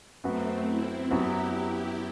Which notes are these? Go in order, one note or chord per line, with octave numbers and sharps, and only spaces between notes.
F#2 F#3 A3 B3 C4 F#4 B4
C4 E4
F#2 F#3 B3 E4 F#4 G4 B4